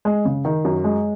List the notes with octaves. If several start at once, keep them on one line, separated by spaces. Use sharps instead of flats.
G#3
C#3
D#3
F#2
G#3